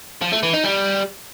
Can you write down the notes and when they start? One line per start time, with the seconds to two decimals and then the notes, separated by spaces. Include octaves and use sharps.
0.21 F3
0.32 A3
0.43 E3
0.53 D#4
0.64 G3